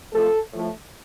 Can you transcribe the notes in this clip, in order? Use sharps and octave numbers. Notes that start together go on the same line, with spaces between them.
F2 F3 A3 A4
A2 F3 A3